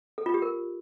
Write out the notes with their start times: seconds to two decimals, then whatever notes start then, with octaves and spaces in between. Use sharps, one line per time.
0.18 A4
0.26 F4
0.34 G4
0.42 A#4